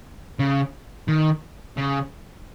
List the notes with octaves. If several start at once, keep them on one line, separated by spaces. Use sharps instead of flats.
C#3
D#3
C#3